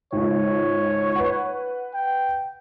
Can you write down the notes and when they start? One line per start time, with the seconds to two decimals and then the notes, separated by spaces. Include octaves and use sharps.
0.13 G#1 C#2 C#5
1.16 B4 F#5
1.94 G5